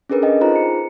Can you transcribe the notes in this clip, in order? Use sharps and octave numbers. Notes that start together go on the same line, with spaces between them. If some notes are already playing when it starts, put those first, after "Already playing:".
C#4 D4 G#4 A#4 B4
G#4 A4 D#5 G5
D#4 F4 G#4 C5 A#5
C#7